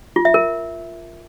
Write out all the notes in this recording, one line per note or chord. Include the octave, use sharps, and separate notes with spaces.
F4
E5
A#4